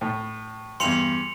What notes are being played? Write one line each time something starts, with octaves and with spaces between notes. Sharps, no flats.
A2
E2 G2 C6 C#7 F7